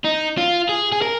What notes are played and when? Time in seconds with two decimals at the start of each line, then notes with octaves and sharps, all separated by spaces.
0.04 D#4
0.37 F4
0.69 G#4
0.92 G#4
1.02 A#4